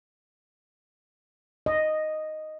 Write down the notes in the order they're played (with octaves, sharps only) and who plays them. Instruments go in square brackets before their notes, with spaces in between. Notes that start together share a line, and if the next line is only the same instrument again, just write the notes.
[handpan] D#5